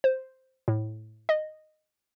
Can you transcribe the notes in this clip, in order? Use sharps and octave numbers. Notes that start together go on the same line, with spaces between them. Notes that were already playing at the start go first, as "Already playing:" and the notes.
C5
A2
D#5